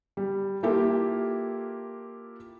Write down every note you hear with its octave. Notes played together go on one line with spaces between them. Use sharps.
G3
A#3 E4 F4 G4 A4